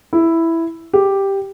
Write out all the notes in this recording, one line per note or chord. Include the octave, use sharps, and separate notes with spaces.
E4
G4